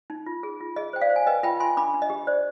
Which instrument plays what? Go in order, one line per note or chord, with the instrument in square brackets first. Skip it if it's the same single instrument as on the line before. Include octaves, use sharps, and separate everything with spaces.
[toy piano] D#4
F4
G#4
F4
G#4 D#5
C5 G5
D5 F5
C5
G#5
B4 D#5 G5
F4 G5 B5
F4 G#5 C6
D4 B5 D6
D4
D#5
G4
C5 D5